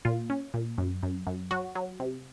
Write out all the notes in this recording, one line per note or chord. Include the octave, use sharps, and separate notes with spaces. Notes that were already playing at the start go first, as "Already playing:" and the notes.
A#2 F4
C#4
A#2
F#2
F#2
F#2
F#3 F#4
F#3
C3